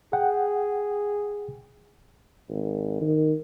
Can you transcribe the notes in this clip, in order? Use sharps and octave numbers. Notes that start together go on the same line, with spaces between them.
G#4 F#5 G5
G#1
D#3